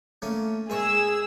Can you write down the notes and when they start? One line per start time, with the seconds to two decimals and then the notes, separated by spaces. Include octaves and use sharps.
0.22 A3 A#3 C#4
0.70 G#2 G#4 A#4 C#6 E6